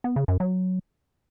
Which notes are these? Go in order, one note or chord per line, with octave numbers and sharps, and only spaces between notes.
B3
C#3
F#2
F#3